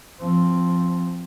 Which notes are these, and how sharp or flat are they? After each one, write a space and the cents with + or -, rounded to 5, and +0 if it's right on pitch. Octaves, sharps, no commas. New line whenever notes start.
F3 +0 C4 +0